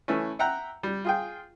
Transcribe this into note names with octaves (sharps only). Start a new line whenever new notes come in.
E3 A3 C#4
E5 F#5 G5 A#5 F#6
G3
F4 G#4 G5